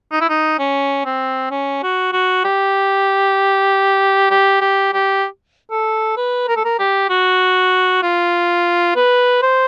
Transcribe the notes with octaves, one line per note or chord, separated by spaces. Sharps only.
D#4
E4
D#4
C#4
C4
C#4
F#4
F#4
G4
G4
G4
G4
A4
B4
A#4
A4
A#4
G4
F#4
F4
B4
C5